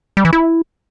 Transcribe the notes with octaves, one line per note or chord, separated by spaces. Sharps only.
G3
E3
E4